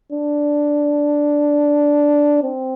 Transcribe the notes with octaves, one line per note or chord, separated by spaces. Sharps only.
D4
C4